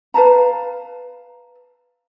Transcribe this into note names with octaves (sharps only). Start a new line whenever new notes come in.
B4 F5 A5 A#5